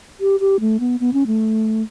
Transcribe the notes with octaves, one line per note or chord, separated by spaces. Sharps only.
G4
G4
A3
B3
B3
C#4
A3